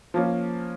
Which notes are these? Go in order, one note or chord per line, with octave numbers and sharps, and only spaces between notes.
F3 A#3 C#4